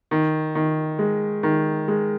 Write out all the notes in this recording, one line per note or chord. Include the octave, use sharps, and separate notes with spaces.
D#3
D#3
G#3
D#3
G#3